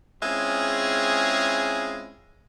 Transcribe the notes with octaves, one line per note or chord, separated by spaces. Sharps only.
G#3 C4 C#4 E4 F4 G#4